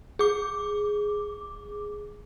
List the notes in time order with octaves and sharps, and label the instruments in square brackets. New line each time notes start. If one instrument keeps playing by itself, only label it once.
[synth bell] G#4 D6